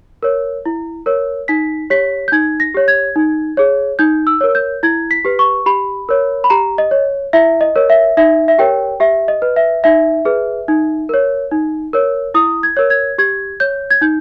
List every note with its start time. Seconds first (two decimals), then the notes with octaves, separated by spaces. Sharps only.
0.23 A#4 C#5
0.66 E4
1.06 A#4 C#5
1.48 D#4 B6
1.90 G4 C#5 B6
2.28 G6
2.32 D#4 G#6
2.60 A#6
2.74 G4 C#5
2.88 G#6
3.16 D#4
3.57 G#4 C#5
3.99 D#4 G6
4.27 E6
4.41 A#4 C#5
4.55 G6
4.83 E4 G#6
5.11 B6
5.25 G4 B4
5.39 C#6
5.66 G4 B5
6.09 A#4 C#5
6.44 B5
6.50 G4 A#5
6.78 D#5
6.91 C#5
7.33 E4 E5
7.61 D#5
7.76 A#4 C#5
7.90 E5
8.17 D#4 E5
8.48 E5
8.58 G4 A#4 C#5 G5
9.00 G4 E5
9.28 D#5
9.42 B4
9.56 E5
9.84 D#4 E5
10.25 G#4 B4
10.68 D#4
11.09 A#4 C#5
11.51 D#4
11.93 A#4 C#5
12.34 E4 D#6
12.63 G#6
12.77 A#4 C#5
12.90 G#6
13.18 G4 G#6
13.60 C#5 G6
13.90 G#6
14.01 D#4 G6